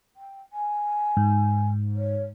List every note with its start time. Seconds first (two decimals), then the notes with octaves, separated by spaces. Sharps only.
0.16 G5
0.53 G#5
1.17 G#2
1.96 C#5